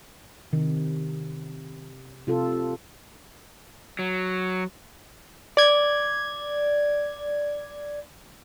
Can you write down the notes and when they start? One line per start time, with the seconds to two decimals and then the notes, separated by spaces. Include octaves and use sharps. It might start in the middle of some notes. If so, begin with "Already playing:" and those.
0.53 C3 D#3
2.27 C3 F4 A4
3.99 F#3
5.57 D5 G#6